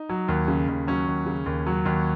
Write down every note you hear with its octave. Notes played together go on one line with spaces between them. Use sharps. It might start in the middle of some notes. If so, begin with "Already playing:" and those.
Already playing: D#4
F#3
D#2
C#3
D#2
F#3 C#4
D#2
C#3
D#2
F#3
D#2